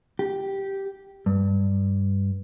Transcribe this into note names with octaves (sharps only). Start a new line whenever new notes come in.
G4
G2